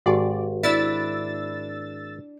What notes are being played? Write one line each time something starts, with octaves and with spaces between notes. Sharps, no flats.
G#1 F#4 G4 D5
D4 E4 E6 A6